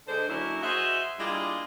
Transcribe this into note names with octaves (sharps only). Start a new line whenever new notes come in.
D3 G#3 C5
F#3 A#3 C#4 D4 E4
F#4 G#4 C5 D#5 E5
G3 G#3 A#3 D4 E4 F4